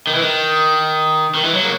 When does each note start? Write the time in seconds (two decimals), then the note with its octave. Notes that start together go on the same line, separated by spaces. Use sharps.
0.07 D#3
0.15 E3
0.22 D#3
1.35 D#3
1.44 E3
1.54 F#3
1.63 A#3